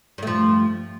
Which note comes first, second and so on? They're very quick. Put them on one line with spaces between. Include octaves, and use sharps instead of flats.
G2 A3 F3